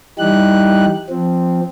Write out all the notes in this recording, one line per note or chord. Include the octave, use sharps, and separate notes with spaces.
E3 G3 D#4 G4 F#6
F3 C4